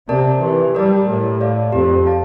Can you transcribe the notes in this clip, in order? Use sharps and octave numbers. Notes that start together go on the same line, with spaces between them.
C3 A#4 D5 A5
E3 G4
G3 A#4 D5 A5
A2 G4
D5 F5 A5
F2 G4
D5 F5 A5